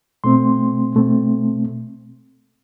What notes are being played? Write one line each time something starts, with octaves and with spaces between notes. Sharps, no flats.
B2 A3 C4 C6
B2 A3 C4